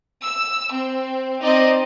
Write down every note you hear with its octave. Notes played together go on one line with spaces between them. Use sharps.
E6
C4
C4 D#4 D5 D#5